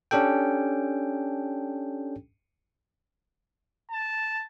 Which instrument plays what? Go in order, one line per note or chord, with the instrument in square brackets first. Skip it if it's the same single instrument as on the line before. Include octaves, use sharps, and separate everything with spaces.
[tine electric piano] C#4 D4 G4 A4 G5
[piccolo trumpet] A5